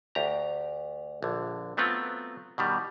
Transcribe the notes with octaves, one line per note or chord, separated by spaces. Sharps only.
D2 G4 A#5
A#1 D3
F#3 A3 B3 C4 F4 F#4
B2 D#3 G3